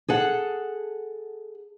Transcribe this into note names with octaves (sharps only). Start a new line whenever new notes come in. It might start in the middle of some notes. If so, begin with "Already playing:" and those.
G#4 A4 F#5